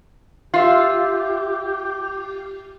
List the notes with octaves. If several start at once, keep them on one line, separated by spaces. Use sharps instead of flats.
F4 G4 E5 C6